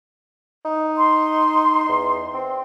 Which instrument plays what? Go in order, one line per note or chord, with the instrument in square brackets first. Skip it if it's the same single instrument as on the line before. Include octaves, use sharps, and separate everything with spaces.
[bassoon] D#4
[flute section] C6
[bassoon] E2
C4